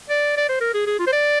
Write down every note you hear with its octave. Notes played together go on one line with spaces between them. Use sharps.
D5
D5
C5
A#4
G#4
G#4
F4
C5
D5